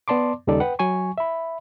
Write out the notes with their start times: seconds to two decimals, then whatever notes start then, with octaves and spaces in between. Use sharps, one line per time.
0.08 B3 D5 A5 C6 D6
0.47 D#2 C#3 G3 D#4 A4 D5
0.60 B4 F#5 G5
0.79 F#3 G#5 C#6
1.18 E5 B5